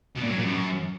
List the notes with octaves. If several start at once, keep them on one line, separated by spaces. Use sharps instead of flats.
B2
A#2
F#3
A#2
F#2